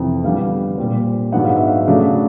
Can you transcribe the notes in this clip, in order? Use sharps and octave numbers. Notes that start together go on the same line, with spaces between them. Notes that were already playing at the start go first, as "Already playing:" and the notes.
Already playing: F2 C3 E3
D3 G3 B3 F5
A#2 G3 C4
G#2 D#3 F#3 B3 D4 F#5
F5
E5
F5
C#3 F#3 A3 D4